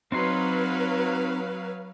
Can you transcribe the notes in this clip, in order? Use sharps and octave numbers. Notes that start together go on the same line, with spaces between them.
F#3 C4 D#4 B4 F5 C6